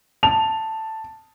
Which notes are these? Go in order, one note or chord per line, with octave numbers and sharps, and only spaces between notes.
A5 F7